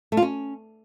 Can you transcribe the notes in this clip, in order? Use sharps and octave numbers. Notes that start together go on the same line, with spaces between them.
A3
F4
C#4